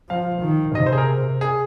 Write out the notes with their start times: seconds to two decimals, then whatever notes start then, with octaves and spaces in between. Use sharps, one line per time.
0.09 F3 F5
0.42 D#3
0.75 C3 D#5
0.86 C5
0.93 G#4
0.98 A#4
1.41 G#4